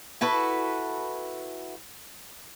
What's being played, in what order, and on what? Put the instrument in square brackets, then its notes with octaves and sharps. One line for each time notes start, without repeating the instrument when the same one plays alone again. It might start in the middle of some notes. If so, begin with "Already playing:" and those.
[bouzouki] E4 F#4 A4 B4